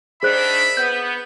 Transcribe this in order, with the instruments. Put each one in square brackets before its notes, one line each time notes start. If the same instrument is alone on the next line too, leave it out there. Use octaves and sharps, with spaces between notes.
[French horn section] D#3 D4 [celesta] G#4 C5 F#6 [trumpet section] E5 B5
[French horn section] B3 [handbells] G6